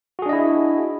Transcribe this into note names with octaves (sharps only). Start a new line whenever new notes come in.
D4 E4 F#4 G#4 D#5